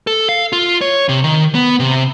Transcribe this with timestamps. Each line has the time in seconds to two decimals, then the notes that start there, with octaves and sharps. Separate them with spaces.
0.07 A4
0.29 F5
0.53 F4
0.81 C#5
1.09 C3
1.24 D#3
1.55 B3
1.80 C3